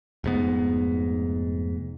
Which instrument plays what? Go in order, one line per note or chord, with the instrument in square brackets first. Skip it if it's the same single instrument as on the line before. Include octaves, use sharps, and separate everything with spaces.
[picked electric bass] F1 G#2 B3